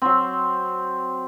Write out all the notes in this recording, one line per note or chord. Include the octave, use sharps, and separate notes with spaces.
F#3 C4